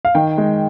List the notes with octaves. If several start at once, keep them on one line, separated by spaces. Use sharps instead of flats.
F5
D#3 G5
G#3